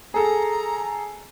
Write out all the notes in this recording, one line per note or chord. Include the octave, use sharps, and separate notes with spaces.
G#4 A4 A#5